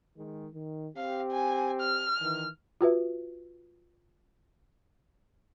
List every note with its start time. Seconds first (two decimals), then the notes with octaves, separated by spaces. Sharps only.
0.17 D#3 G#3
0.55 D#3
0.97 C4 G4 F5
1.32 G#5
1.81 F6
2.22 D#3 E3
2.81 F4 F#4 B4 E5